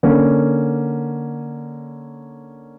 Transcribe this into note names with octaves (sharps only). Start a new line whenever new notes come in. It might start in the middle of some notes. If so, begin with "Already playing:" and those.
D3 A#3 C#4